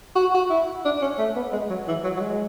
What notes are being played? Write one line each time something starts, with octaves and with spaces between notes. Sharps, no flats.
F#4
F#4
E4
D4
C#4
A3
B3
G#3
F#3
E3
F#3
F#3
G#3